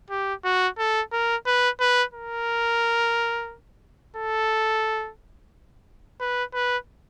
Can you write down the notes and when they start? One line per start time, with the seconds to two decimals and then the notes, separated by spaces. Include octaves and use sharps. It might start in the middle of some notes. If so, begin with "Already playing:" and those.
0.10 G4
0.45 F#4
0.78 A4
1.12 A#4
1.46 B4
1.80 B4
2.14 A#4
4.17 A4
6.20 B4
6.54 B4